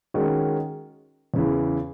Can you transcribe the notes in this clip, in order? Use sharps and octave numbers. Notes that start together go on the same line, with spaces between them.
D#3 G#3 C#4 F#4
E2 C#3 E3